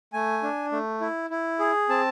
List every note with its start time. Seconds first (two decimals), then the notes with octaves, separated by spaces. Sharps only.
0.13 A3 G#5
0.43 D4
0.72 A3
1.01 E4
1.30 E4
1.59 G#4
1.89 C4 A5